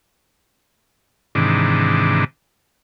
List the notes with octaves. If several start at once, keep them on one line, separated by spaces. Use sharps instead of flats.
G#2 C3 D#3 E3 D4